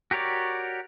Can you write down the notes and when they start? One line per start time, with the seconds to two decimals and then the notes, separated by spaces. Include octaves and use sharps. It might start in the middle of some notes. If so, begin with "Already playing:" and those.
0.11 F#4 G4 A#4 C#5 D5